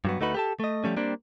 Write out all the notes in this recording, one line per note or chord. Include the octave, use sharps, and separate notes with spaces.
G2 F#3 B3
D2 A3 D#4 F#4 B4
G4 A4 A5
A3 D#5
F3 G3 A3 C#4
G3 A#3 C4 D4